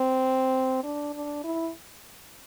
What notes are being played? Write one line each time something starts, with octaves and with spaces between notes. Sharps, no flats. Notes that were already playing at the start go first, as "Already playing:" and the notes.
Already playing: C4
D4
D4
E4